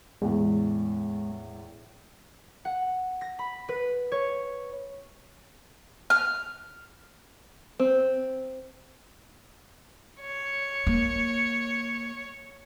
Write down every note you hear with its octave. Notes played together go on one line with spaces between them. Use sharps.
E2 A2 G#3
F#5
A#6
B5
B4
C#5
F6
C4
C#5
A#3